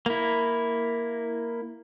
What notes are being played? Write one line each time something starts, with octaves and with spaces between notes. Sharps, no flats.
A#3 E4